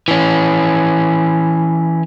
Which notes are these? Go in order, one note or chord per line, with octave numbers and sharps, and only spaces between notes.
E3 C#4